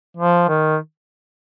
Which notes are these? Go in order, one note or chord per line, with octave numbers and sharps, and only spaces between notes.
F3
D#3